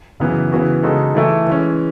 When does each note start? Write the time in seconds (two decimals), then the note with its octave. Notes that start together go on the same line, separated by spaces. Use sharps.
0.20 F#2 C#3 E3 B3
0.52 C#3 E3 B3 F#4
0.83 C#3 G#3 D#4 F#4 A4
1.15 E3 A3 E4 A4
1.47 E3 G#3 C#4